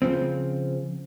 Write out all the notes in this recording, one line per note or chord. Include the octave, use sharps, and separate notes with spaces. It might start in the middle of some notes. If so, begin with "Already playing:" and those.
C#3 F3 C4